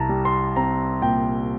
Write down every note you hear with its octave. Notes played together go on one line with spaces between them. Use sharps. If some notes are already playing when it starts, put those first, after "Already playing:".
Already playing: C2 A5 A#5
G3
C6
C4 A#5
A#2 G5